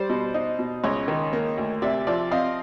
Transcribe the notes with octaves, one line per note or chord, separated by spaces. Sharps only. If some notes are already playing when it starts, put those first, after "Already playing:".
Already playing: G3 C5 D5
B2
D#4
B2
C#2 C#5 D#5
D#3
A#3
D2
C3 D5 E5
F3 D5 E5
C4 D#5 F5